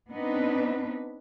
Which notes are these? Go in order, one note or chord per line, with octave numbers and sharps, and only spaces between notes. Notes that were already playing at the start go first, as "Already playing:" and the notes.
B3 C4 D4 D#4 B4